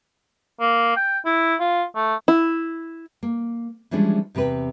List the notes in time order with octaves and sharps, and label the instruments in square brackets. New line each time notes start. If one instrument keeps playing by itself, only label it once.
[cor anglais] A#3
G5
E4
F4
A3
[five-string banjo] E4
[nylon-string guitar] A#3
E3 F3 G3 G#3 C#4 D4
E2 C3 C4 B4